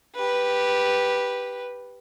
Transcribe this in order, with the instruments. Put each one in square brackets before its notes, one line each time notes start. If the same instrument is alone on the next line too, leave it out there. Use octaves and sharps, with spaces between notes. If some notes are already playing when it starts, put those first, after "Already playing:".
[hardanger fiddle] G4 B4